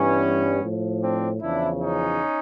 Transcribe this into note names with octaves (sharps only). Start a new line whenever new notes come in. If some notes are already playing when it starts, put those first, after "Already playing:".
Already playing: G2 E3 G3 B3 C#4
A2 F3
C4 D4
E2 C#3 F3 D4 E4
C#4 D#4